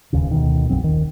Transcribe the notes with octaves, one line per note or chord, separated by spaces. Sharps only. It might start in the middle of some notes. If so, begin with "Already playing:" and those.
E1 D#2 C#3
D2 B2 D#3
A#1 F2 F#3 C4
D#1 D#3